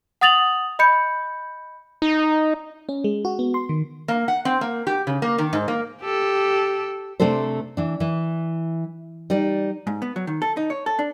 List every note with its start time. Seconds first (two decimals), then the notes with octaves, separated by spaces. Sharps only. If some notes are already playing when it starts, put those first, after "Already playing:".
0.21 F#5 D#6 A6 F7 F#7
0.79 D#5 B5 G6 C#7
2.02 D#4
2.89 C#4
3.04 G#3
3.25 F#4
3.39 B3
3.54 C6
3.69 D#3
4.08 A#3
4.28 F#5
4.45 C4
4.61 A#3
4.87 G4
5.07 C#3
5.22 A#3
5.38 D#3
5.53 G#2
5.68 A#3
6.02 G4 A4
7.20 C3 A3 D4 A4 C5
7.77 E3 D4
8.00 E3
9.30 G3 D#4 D5
9.87 G#2
10.02 B3
10.16 F#3
10.27 D#3
10.42 A4
10.57 D#4
10.70 C#5
10.86 A4
10.99 D4